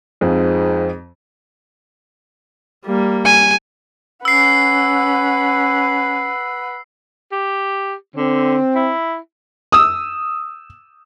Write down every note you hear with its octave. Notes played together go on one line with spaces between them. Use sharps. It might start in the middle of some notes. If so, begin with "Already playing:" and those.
F2 G#2 F3
G3 A#3
G#5
C#4 B4 F#5 E6 C7
G4
D3 C4
E4
D#6 E6